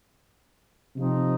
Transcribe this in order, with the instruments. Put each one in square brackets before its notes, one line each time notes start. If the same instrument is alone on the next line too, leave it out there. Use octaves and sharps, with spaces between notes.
[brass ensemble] C3 F3 C4 D#4